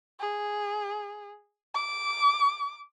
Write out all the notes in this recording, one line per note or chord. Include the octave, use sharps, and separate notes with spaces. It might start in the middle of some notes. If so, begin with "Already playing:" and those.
G#4
D6